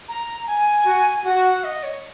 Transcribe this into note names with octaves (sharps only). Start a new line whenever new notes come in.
A#5
G#5
F#4
F#4 F#5
F#5
D#5
C#5